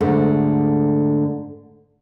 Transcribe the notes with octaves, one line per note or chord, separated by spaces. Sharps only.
G#2 D3 A3